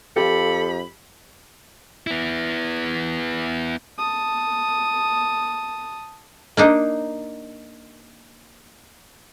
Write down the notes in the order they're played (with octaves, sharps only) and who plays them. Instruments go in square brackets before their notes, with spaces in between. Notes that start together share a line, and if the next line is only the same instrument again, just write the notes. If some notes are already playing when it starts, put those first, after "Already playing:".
[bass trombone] F2 [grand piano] F4 G4 [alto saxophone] A4 [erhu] B5
[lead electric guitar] B3 E4
[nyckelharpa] A5 D#6
[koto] A#3 D4 D#4